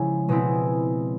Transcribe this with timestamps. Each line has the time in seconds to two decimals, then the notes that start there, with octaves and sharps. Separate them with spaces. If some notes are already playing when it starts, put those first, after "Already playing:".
Already playing: C#3 F3 G#3 C#4 E4
0.29 B2 G#3 C4 E4